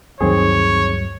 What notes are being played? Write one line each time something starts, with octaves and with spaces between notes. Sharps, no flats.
D2 G2 D#3 F#3 C4 G#4 C#5